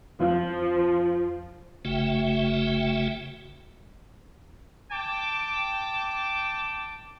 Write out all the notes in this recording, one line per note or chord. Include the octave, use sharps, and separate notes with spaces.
F2 F3 F4 F5
F#1 C#3 A3 F#4 E5 G5
G5 A5 D6